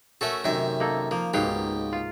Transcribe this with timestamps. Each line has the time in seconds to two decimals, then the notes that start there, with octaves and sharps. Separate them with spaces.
0.21 A3 C#4 F#4 A4 A#4 E5
0.44 F#2 C3 D#3 E5
0.80 A#3 D#4 A4
1.11 F3 A#3
1.34 C#2 G#2 B2 G4 F5
1.93 F4